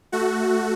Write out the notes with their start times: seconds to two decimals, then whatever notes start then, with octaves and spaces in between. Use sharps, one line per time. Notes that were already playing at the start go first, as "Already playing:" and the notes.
0.12 A3 F#4